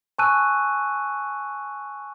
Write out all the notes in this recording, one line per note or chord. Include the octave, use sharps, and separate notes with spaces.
G#5 A5 C#6 E6 F#6 D#7